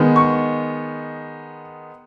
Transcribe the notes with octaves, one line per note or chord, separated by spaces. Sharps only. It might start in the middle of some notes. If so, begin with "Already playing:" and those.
Already playing: D#3 G#3 B3
C#6